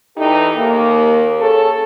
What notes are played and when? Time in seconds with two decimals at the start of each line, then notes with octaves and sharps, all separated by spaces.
0.17 E2 E3 D#4 G4 A4
0.56 D#2 A#3
1.39 C#4 G#4 A4